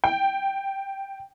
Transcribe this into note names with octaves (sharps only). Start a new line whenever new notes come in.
G5